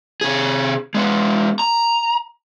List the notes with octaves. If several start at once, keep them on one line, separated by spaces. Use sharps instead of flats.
C3 G#4
G#3 B3
A#5